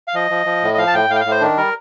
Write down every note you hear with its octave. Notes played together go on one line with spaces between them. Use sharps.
F5
F3 D#5
F3
F3
A2
D#5
F3 F5
A5
A2 G5
A2 F5
G5
F5
A2
C5
D#3 D4
G3 A#4